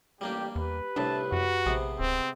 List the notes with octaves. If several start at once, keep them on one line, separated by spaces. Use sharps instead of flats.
A1 G3 A#3 D4 G4
E2 G4 B4
C2 A2 D4 A5
F#2 F#4
A#1 G#2 C3 B3
D1 C4